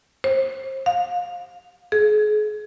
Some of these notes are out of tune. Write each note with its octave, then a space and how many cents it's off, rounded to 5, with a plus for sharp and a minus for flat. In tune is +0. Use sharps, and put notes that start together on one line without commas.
C5 +30
F5 +20
G#4 +35